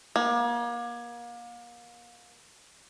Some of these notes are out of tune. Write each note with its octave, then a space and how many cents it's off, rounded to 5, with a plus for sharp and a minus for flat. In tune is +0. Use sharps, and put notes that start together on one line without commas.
A#3 +35